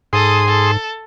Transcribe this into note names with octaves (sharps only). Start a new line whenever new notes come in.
G#2 G#4 A4 C6 D#6
A4